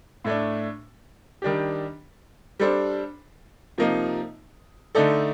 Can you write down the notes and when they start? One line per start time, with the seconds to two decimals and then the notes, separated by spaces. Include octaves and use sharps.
0.25 A2 A3 D4
1.42 D#3 G3 D4 G4
2.60 G3 D4 A4 C5
3.78 C3 F3 A#3 D#4
4.95 D3 A3 D#4 A4 D5